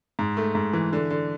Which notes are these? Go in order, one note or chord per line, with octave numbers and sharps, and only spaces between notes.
G#2
A3
G#2
E3
D3
D3